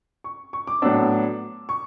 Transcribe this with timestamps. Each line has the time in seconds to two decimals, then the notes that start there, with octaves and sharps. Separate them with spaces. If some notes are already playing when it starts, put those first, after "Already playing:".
0.24 C#6
0.53 C#6
0.67 D6
0.82 A2 F#3 B3 D4 E6
1.69 C#6